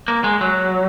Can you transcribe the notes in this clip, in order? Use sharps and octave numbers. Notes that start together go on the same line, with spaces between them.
A#3
G#3
F#3